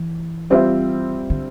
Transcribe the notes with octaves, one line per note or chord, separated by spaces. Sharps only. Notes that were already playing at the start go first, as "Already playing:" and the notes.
Already playing: E3
G3 C4 F4 C5 E5
D3